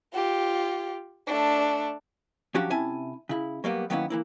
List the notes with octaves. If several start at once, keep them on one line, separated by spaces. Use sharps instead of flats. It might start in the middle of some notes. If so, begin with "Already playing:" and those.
F4 G4
A3 D4
F3 F#3 C#4 D4 F#4 G4
C3 C#4 E4 G#5 A5
C#3 E4
F#3 G3 A#3 B3
D#3 F#3 A#3 B3 C#4 E4
E3 A#3 E4